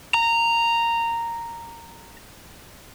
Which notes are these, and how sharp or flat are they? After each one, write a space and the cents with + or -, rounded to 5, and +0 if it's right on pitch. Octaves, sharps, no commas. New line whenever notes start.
A#5 -10